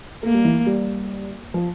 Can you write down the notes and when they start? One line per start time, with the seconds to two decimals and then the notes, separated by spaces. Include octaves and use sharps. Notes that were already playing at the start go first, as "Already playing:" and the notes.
0.23 A3 A#3
0.34 G3
0.45 E3
0.66 G3
1.54 F3